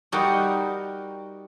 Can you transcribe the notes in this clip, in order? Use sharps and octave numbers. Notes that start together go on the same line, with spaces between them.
G3 D#4 F#4 A#4